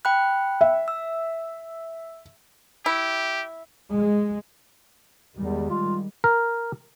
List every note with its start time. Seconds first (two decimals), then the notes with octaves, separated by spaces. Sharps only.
0.05 G5 B5 F#6
0.61 E5
0.88 E6
2.86 E4 G4
3.96 G#3
5.37 E2 D#3 G3 G#3
5.70 F4
6.24 A#4